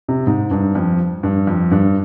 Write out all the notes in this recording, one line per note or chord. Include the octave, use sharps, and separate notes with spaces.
C3
G#2
G2
F2
G2
F2
G2